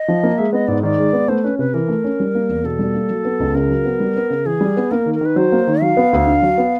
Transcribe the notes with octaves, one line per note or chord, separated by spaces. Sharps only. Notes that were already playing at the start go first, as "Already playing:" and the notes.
Already playing: D#5
F3
A#3
G#3 E5
B3 D#5
G#2 D5
D#3 D5
G#3
B3
A3 C5
C#4 B4
C3 B4
E3 A#4
A3
C#4
G3
A#3
E2
B2 A4
G3
A#3
F#3
B3
C#2
C#3 A#4
F#3
B3
G3
B3
C#3
E3 G#4
G3
B3
A#3 A#4
D#3
A#4
D#3 B4
F#3 C5
A#3
D#3
F#3 F5
B3
D2
D3
F#3
B3